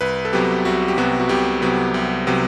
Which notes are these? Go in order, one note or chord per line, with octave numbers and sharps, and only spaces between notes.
C2 B4
A4
C3 F#3 B3 G4
C2 F#4
G4
C3 F#3 B3 F#4
F#4
C2 G4
C3 F#3 B3
C2
C3 F#3 B3